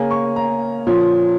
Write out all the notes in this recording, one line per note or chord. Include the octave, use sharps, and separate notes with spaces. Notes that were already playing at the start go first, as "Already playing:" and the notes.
Already playing: C#3 A#3 C#4 G#5
C#6
A#5
A#2 F3 C#4